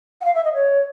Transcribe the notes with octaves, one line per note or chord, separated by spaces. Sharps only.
F#5
F5
E5
D#5
C#5